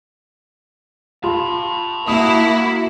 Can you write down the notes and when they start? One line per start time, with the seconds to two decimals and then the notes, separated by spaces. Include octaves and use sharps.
1.24 F4 A5 B5
2.08 A#3 E4 F#4 D#6